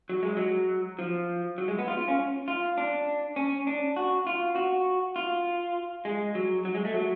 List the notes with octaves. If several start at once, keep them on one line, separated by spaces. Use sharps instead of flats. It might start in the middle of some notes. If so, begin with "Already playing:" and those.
F#3
G#3
F#3
F3
F#3
G#3
B3
F4
F4
C#4
F4
D4
C#4
D4
F#4
F4
F#4
F4
G#3
F#3
F#3
G#3
A3
F#3